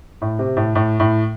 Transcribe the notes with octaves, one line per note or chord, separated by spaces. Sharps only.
A2
C3
A2
A2
A2